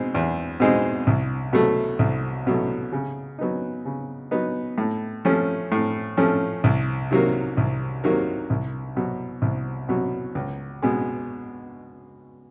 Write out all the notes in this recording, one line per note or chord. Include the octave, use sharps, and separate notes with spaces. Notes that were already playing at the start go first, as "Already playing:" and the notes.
Already playing: B2 G#3 C4 D#4
E2
B2 G#3 C4 D#4
C2
B2 F#3 A3
C2
B2 F#3 A3
C#3
F#3 B3 D#4
C#3
F#3 B3 D#4
A2
F3 A3 C#4
A2
F3 A3 C#4
C2
C3 D#3 F#3 A#3
C2
C3 D#3 F#3 A#3
C2
B2 F#3
C2
B2 F#3
C#2
B2 G#3